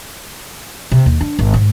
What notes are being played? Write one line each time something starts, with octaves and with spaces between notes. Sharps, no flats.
C3
D#2
D4
G#1
G#2